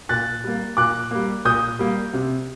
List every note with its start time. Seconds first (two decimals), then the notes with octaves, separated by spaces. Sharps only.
0.09 A#2 F#6 A6
0.44 G3 A#3
0.77 A#2 D6 F#6
1.11 G3 A#3
1.45 A#2 D#6 G6
1.79 G3 A#3
2.13 C3